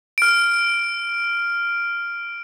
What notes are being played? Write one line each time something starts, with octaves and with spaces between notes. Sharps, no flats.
F6 D7